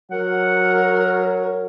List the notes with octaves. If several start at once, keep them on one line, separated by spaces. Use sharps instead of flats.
F#3 A#4 F#5